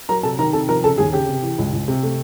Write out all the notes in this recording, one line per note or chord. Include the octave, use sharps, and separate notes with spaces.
F#3 A#4 A#5
C3 A4 A5
D#3 A#4 A#5
C3 A4 A5
F3 A#4 A#5
C#3 A4 A5
D#2 G#4 G#5
C#3 G4 G5
C3
E3
C#2
C#2
C3
A3